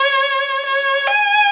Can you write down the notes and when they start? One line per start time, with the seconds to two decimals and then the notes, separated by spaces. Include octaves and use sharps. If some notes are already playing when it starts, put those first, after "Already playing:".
Already playing: C#5
0.66 C#5
1.08 G#5